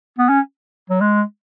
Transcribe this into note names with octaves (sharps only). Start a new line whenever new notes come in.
B3
C#4
F#3
G#3